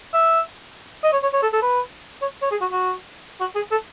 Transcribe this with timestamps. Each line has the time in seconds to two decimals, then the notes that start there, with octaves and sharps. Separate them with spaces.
0.13 E5
1.03 D#5
1.13 C#5
1.23 C#5
1.33 C#5
1.42 A4
1.53 A4
1.62 B4
2.22 C#5
2.42 C#5
2.51 G#4
2.61 F#4
2.72 F#4
3.40 F#4
3.55 G#4
3.71 A4